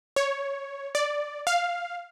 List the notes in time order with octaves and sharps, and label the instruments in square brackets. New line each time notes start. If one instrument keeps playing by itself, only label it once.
[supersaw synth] C#5
D5
F5